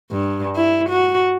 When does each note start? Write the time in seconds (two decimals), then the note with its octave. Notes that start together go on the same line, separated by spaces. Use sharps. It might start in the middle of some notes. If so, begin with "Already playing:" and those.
0.11 G2
0.56 E4
0.89 F#4